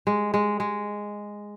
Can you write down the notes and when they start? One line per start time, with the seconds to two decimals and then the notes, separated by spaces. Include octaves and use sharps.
0.07 G#3
0.34 G#3
0.60 G#3